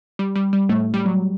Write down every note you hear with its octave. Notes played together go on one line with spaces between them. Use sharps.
G3
G3
G3
A2 A3
G3
F#3